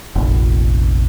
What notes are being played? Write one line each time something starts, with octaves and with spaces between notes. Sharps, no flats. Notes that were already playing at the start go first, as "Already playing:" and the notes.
F1 A#1